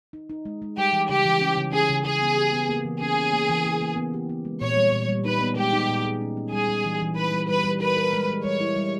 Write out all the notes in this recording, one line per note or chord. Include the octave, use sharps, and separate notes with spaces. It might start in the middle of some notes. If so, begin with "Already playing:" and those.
D#4
D#4
G#3
G#3
G3 G4
E3
C#3 G4
E3
C#4
C#3
C#4 G#4
C#3
C#3 G#4
B3
G4
B3
A#3
E3
C#4 G#4
C#4
A#3
E3
A#3
A#3
B3
G4
B3
G#3
A#2 C#5
G3
A#2
G3
D#4 B4
B3
G#3 G4
D#4
A#2
G#4
C#4
C#4
G3 G#4
G3
E3
E3
G3 B4
G3
G3 B4
G3
A#4 B4
A#4
G#3
G#3
G3 C#5
E4
G3